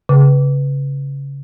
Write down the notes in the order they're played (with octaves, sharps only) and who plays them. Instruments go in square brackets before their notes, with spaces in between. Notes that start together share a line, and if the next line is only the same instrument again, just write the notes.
[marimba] C#3